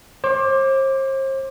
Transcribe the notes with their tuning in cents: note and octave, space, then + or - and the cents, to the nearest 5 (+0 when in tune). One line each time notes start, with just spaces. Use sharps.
C5 +40 D6 +0